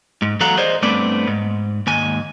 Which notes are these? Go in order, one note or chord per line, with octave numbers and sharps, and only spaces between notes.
G#2
E2 F#3 A4 F5 F#5 A#5
G#4 A#4 C5 D5 D#5
G2 A3 B3 C4 D5
G#2
D#2 G#2 G#5